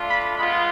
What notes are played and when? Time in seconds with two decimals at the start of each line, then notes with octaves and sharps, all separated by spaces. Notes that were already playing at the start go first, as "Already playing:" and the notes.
Already playing: A3 D4 F4
0.09 B5
0.37 G#3 B3 F4 B5